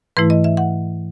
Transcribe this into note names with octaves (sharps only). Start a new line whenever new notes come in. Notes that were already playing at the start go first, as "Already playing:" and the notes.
G#2 E3 A3 E4 B4
D#5
E5
F#5